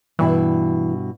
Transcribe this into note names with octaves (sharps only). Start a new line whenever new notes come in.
G2 B2 E3 E4